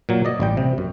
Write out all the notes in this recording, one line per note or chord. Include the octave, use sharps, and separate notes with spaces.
A#2 F#3
D5 D#5
A1 G3 G5
C3
F#2